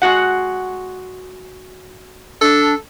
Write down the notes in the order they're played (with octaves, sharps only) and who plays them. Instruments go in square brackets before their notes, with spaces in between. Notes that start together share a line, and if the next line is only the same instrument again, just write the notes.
[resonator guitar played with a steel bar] G#3 F#4 F#5
[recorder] D4 [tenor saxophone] A4